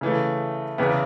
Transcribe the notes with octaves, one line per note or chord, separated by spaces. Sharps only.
C#3 E3 A3
E2 C#3 E3 B3 E4